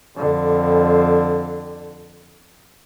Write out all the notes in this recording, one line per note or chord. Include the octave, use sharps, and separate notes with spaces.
F2 D3